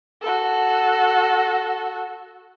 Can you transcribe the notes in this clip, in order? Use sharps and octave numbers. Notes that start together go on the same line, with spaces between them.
F#4 A4